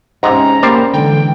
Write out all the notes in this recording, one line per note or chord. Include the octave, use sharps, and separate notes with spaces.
G#2 C3 G#3 C#4 A#5
G3 A#3 C5 D5
D3 E3 G#3 G5